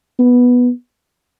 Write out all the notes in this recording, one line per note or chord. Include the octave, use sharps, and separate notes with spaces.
B3